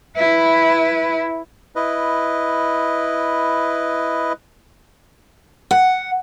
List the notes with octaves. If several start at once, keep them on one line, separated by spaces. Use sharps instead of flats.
E4 B4
E4 B4 D#5
F#5